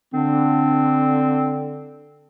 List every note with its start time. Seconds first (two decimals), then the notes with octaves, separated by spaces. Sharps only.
0.14 D3 C4